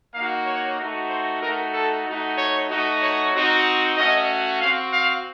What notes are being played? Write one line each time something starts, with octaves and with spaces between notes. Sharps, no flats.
A#3 D#4 F#4 F5
C#5
A3 D#4 F#4
C5
A3 D#4 F#4 A#4
A4
A3 D#4 F#4
C#5
A3 D#4 F#4
C#5
C4 D#4 F#4
A3 C#4 F#4 D#5
C4 F#4 F5
F5